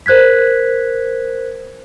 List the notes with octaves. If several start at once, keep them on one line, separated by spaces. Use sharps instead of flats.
A#4 C5 F#6 G#6 B6